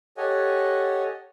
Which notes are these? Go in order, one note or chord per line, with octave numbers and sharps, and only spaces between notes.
G4 A4 C#5 D#5 F#5 G#5